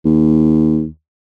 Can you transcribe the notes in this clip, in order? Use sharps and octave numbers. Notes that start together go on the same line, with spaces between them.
D#2